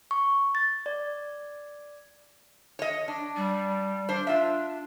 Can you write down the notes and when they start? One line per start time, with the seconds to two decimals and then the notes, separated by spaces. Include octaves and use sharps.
0.11 C#6
0.55 A6
0.86 D5
2.79 C#5 D#5
3.08 D4
3.36 G3
4.09 D4 C5
4.27 D4 F4 E5